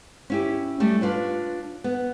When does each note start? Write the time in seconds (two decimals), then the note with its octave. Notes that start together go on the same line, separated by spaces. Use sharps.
0.30 C#4 E4 G4
0.80 G3 A3 C#4
1.01 D4 F4 B4 C#5
1.84 B3